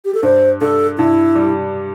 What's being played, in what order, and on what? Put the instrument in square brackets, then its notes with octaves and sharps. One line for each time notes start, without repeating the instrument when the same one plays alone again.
[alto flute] G4
A4
[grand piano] G2 [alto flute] C5
[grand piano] G2 [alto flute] A4
[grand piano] G2 [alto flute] E4
[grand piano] G3